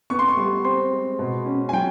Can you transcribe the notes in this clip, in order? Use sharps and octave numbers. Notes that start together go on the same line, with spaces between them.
B3 C#6
C6
C#6
G3
C4 C6
G#3
B2
C#4
G#5
F#3 G5